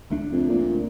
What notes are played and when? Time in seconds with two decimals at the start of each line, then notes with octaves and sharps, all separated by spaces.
0.10 C#2 A3 D4
0.32 F2
0.49 A#2